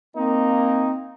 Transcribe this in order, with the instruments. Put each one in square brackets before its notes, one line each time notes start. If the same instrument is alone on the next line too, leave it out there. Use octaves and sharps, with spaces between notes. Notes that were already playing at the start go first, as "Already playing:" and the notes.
[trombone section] A#3 [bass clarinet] C4 [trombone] D#4